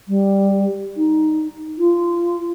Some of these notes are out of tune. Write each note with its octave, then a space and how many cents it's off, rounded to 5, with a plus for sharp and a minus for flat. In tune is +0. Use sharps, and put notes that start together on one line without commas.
G3 +5
D#4 +5
F4 -20